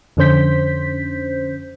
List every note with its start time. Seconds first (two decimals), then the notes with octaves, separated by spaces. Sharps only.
0.17 F2 D3 C#4 C5 G6 B6